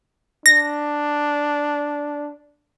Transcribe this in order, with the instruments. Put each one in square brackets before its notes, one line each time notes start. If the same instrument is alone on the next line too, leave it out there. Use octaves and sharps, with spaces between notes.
[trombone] D4 [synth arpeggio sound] A#6